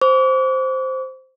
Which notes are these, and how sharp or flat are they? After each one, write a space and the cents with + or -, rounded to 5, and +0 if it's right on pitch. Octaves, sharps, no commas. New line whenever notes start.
C5 +0 D6 -45